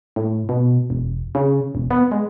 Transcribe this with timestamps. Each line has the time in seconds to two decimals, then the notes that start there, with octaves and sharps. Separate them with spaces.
0.16 A2
0.49 B2
0.90 E1
1.35 C#3
1.75 E1
1.91 B3
2.11 G#3